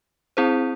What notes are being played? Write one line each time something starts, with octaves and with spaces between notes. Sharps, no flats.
C4 E4 G#4 C5